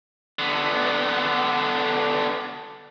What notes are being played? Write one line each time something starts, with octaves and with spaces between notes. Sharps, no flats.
D3 B3